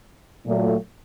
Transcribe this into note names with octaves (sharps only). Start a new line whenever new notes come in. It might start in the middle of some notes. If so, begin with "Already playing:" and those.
A#2 F#3 A3